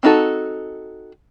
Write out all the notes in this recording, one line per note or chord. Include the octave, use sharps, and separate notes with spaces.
C4 D4 D#4 F#4 A4